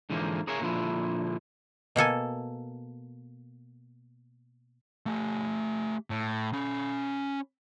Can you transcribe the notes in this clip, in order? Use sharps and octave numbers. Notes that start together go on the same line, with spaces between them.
G#2 D3 E3 F3 A3 A#3
G#4 A#4 C#5 E5 F5 G#5
A#2 D3 D#3 F3 E4
B2 A#3 A4 G#5
A3 G4
A2
C#4 B5